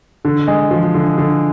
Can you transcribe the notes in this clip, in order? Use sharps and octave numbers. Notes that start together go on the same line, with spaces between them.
D3
G#3
F3
D3
D3